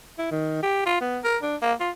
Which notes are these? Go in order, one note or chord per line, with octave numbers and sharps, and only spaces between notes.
E4
D#3
G4
F4
B3
A#4
D4
A#3
F4